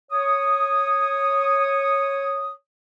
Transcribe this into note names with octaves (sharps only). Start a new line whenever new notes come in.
C#5 D#6